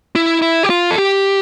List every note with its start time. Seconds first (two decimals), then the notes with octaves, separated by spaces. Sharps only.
0.16 E4
0.42 E4
0.63 G4
0.70 F4
0.91 A4
0.98 G4